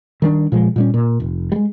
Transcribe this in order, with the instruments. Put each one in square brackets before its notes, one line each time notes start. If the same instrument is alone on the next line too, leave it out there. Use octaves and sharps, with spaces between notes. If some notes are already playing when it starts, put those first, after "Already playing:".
[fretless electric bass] D#3 G3 A3 D4
A#2 F3 G#3
A#2 G3 C#4
A#2
F1
G3 G#3